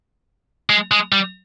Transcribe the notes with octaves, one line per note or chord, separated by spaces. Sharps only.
G#3
G#3
G3